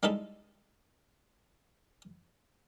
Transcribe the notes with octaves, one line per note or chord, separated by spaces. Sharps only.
G3 G#3 D#4 E4 A4 E5